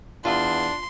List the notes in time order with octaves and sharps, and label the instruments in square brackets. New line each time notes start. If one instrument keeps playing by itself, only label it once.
[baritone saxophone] E2 [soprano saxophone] D4 [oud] F4 [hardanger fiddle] C6